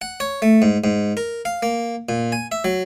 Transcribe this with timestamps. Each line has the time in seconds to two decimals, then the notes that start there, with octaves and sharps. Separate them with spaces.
0.02 F#5
0.20 C#5
0.42 A3
0.62 G#2
0.84 G#2
1.17 A#4
1.45 F5
1.63 A#3
2.09 A#2
2.32 G#5
2.52 E5
2.64 F#3